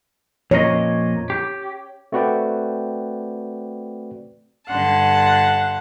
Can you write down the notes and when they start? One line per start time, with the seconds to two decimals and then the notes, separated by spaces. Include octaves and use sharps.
0.51 F2 A#2 C#5 D#5
1.30 G4
2.12 A3 C4 F#4 B4 D5 G5
4.69 G2 D3 F#5 A5 C6